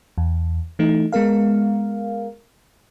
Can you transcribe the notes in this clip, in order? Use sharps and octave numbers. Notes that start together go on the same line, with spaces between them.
E2
E3 A3 D#4
G#3 B3 A#4 F5